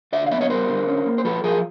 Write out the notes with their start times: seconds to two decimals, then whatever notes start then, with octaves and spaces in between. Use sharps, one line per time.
0.13 D3 D5 E5
0.27 F5
0.31 B3 D5 E5
0.41 C#5 D#5
0.50 G3 A#4 C5
0.69 D3
0.87 C#4
1.06 A#3
1.18 C5
1.25 F3 A4 B4
1.44 F3 G#4 A#4